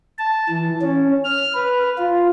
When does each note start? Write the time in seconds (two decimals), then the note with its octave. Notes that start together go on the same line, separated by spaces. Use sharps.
0.18 A5
0.49 E3
0.82 C#4
1.25 F6
1.55 B4
1.98 F4